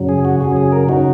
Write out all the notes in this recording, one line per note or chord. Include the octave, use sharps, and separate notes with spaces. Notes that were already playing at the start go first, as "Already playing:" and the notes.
Already playing: F#2 C#3 F#3
G#4
F#4
F#2 C#3 F#3 G#4
G#4
A#4
C#3 F#3 D#4 F#4